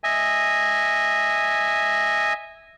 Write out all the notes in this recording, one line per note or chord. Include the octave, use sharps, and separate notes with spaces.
D#5 E5 G#5